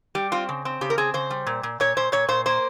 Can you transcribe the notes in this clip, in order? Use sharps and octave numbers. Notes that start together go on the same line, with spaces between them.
G3 G4
C4 F4
C#3
C4
C#3 G4
A#4
C4 G#4
C#3 C5
G3
A#2
A#2
A#2 C#5
A#2 C5
A#2 C#5
A#2 C5
A#3 C5